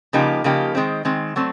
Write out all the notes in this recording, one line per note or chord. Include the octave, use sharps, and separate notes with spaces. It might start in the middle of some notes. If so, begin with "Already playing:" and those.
C#3 F3 A#3 D#4 G4
C#3 F3 A#3 D#4 G4
D#3 G#3 C4
D#3 G#3 C4
F#3 A3 C4